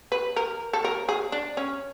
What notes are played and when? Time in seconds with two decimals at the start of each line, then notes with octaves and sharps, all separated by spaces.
0.12 B4
0.36 A#4
0.73 A4
0.84 A#4
1.09 G#4
1.32 D4
1.57 C#4